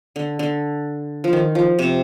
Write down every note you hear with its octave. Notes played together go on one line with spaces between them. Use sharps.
D3
D3
F3
D#3
F3
C3